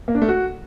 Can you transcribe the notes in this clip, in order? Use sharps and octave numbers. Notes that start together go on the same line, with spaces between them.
A#3
D4
A3
F#4